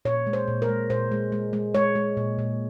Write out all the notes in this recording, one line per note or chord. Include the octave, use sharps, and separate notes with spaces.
A#2 C#5
G#3
C5
A#2
A#4
G#3
A#2 C5
G#3
G#3
G#3
G#3 C#5
G#3
A#2
A#2